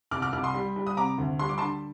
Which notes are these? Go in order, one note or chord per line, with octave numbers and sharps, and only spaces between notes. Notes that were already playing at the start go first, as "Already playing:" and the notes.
C2 D6 F6
D6 F6
C2 D6 F6
C6 D#6
G3
G3
D#6
C3 A#5 D6
D2
G3 C6
D6
A5 C6
D3